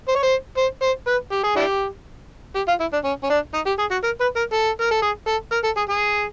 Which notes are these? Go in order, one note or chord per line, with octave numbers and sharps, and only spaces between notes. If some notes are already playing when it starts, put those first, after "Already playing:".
C5
C#5
C5
C5
C5
B4
G4
G#4
D4 E4 G4
G4
F4
E4
D4
C#4
C#4
D4
D#4
G4
G#4
F#4
A#4
B4
A#4
A4
A#4
A4
G#4
A4
A#4
A4
G#4
G#4